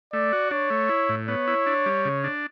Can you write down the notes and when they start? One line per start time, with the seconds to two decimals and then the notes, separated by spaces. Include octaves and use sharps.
0.13 A3 D5
0.33 F#4
0.51 D4 C#5
0.70 A3
0.89 E4
1.09 A2
1.28 B3 C#5
1.48 E4
1.66 D4
1.86 G3
2.05 C#3
2.24 D4